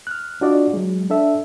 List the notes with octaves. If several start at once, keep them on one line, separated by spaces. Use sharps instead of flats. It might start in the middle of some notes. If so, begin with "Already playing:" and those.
F6 F#6
D4 F4 F#4 D5 D#5
F#3 G#3
D4 A4 E5